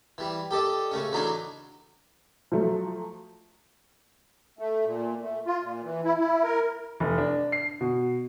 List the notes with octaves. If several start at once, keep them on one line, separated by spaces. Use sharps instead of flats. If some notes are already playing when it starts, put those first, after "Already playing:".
E3 G3
G4 A4 D5 D#5
C#3 A3 C#4
E3 F#3 A3 D4 D#4
F3 F#3 A3
A3
A#2
A3
F4
A#2
E3
E4
E4
A#4
F1
D4
C7
B2